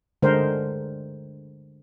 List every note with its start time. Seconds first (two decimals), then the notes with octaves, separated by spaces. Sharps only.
0.22 D3 G#3 D4 A#4 C5